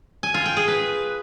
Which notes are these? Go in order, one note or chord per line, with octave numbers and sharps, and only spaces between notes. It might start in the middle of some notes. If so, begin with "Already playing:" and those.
G#5
F4
G5
G#4
B4